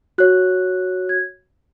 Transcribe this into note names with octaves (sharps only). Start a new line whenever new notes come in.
F#4 C#5 F#6
G#6